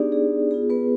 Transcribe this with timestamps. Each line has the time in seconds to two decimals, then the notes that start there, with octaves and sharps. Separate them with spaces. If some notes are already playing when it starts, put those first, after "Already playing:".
Already playing: B3 D4 D#4 G4 G#4 D5
0.12 G#4
0.51 B3 F4 G#4
0.70 B3 B4